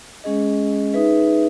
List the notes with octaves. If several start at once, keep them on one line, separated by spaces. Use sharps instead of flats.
G#3 C#4 G#4 D#5
D#4 G#4 B4 E5